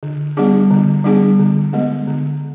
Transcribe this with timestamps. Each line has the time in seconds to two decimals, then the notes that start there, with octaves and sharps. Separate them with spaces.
0.03 D3
0.37 G3 B3 D4 G#4
0.71 D3
1.04 G3 B3 D4 G#4
1.39 D3
1.73 G#3 B3
2.07 D3